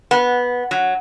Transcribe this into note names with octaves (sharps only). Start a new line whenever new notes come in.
B3
F#3